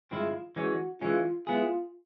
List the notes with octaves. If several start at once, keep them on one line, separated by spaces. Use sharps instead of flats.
G2 D#3 G#3 C4 E4 F4
E3 G#3 C#4 F#4
E3 G#3 C#4 F4
G#3 B3 E4 F4 G#4